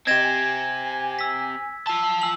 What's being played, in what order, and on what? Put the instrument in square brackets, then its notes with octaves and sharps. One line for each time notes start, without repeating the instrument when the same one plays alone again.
[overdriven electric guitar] C4 G4 [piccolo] D#5 [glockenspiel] G#6 A#6 E7
[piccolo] G#5
[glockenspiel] E6 B6
[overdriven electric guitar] F4 A5 [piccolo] E6
[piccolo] G#5 [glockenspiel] E6 F#7